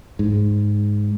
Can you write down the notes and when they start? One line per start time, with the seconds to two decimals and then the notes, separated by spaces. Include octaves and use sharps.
0.19 G#2